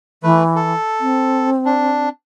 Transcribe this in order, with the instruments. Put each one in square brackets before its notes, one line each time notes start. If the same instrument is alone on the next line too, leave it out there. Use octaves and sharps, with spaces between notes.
[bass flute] E3 [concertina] A3 B4
[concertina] A4
[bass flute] C4
[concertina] D4